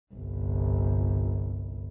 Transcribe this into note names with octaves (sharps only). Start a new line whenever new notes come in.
G1 C2